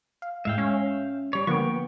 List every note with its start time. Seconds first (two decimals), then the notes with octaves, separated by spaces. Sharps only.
0.22 F5
0.45 A2 G#3 E5 F5 G5
0.58 C#4
1.33 G3 C#5
1.47 D3 F3 A#3 B3 G5 C#6